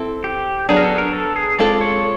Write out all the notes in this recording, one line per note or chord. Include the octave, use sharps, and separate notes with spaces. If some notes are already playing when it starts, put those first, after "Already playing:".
Already playing: C4 E4 A4
G4
F#3 B3 D4 G#4
A#4
A4
A#4
A4
G#4
G#3 C4 F4 A4 D5
C#5